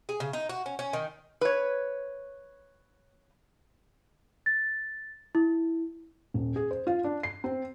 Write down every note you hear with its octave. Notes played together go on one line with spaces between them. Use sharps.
G#4
C#3
D#4
F#4
C#4
C#4
D#3
B4 C#5
A6
E4
D#1
G#4
C5
F4
D4
C7
C4